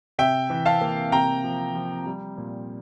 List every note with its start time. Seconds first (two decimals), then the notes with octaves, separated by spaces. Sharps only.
0.19 C3 E5 G5
0.50 E3
0.66 F5 A5
0.81 A#3
1.12 C3 G5 A#5
1.44 F3
1.75 F3
2.06 G3
2.38 A#2